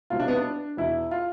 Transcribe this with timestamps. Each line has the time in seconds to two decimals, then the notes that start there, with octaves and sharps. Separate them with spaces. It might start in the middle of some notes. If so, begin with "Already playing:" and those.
0.10 C2 B2 F4
0.20 D4
0.28 B3
0.36 D4
0.77 E2 B2 E4
1.11 F4